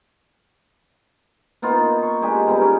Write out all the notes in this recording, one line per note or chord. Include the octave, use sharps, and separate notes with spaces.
A#3 B3 D#4 F4
D#4
C#6
G#3 D4 G4 G#4
G3 B3 D#4
C#4